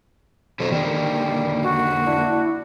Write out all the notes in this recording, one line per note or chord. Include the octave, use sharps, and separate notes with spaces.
F2 B2 D#3 F#3
D3 D#3 G3 A#3
F#4
D4 E4